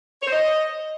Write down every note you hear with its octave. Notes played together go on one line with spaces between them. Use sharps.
C#5
C5
D#5